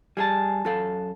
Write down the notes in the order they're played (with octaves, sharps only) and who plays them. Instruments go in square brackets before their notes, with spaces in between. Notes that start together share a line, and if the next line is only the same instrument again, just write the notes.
[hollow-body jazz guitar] G3 G#4 [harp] G#5 A5
[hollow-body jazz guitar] F#2 A4 F5